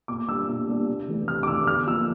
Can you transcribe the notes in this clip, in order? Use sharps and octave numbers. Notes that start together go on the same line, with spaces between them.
A#2 D6
G3 A#3 D4 E6
A#2
G3 A#3 D4
C3
E3 A3 D4
C3 F6
D6
E3 A3 D4 E6
D3 F6
F3 A#3 D4 E6